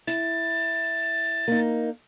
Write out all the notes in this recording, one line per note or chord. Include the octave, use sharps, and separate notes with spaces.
E4 A6
A#3 D#4